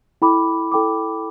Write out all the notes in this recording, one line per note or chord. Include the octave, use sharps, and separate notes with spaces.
E4 A4 G5 B5 D6
E4 A4 G5 B5 D6